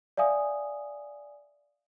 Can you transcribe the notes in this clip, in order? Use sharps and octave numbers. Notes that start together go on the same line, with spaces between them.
D5 E5 F5 G#5 D#6